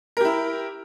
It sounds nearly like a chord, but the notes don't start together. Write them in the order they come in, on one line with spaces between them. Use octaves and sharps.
A#4 G4 E4